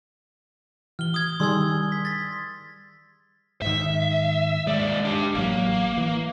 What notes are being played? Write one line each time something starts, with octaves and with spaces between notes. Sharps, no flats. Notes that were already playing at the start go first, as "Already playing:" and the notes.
E3 F6 G7
D#6 G#6
D#3 G3 G#4 C6 E6 G#6
B6
A6 B6
G#2 D#3 E5
D#2 G#3 D5
D4 G4
A1 F#3 A#3
E3